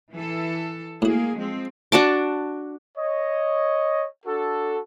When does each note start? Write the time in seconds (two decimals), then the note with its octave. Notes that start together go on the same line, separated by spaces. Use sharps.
0.13 E3 A4
1.02 A2 G#3 A#3 F#4 G#4
1.37 F3 G#3 C4
1.92 D4 F#4 A5 D6
2.98 C#5 D#5
4.26 D4 F#4 A4